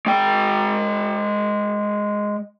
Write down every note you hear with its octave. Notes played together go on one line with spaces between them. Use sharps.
G#3 G5